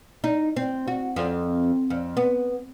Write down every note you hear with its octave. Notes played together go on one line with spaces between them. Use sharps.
D#4
C4
F#4
F2
F2
B3